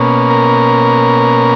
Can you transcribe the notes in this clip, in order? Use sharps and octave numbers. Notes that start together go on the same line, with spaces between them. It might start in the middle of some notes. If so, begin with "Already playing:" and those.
Already playing: B2 A#3 C#4
A#4